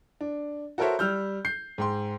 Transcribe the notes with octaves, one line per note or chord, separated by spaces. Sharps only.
D4
F#4 A4 A#4 C5 C#5 E5
G3 E6 F6 G6
G6 C7
G#2 G5 C6